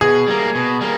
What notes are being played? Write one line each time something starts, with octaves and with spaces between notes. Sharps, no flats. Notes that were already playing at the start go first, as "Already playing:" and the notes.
B2 G#4
G3 A#3
B2
G3 A#3